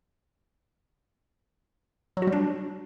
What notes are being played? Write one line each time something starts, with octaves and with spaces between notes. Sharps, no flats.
F#3
F#4
G3
D4